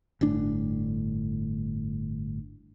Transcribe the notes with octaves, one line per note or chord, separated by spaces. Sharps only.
G1 A2 D4